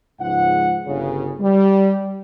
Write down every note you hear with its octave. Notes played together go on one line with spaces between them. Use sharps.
C#2 G#2 F3 F4 F#5
G1 C#3
G3